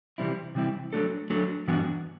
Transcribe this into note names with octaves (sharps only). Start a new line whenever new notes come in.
C3 E3 G3 C4 E4
C3 E3 G3 C4 E4
F#3 A3 D4 A4
F#3 A3 D4 A4
G2 E3 B3 D4 F#4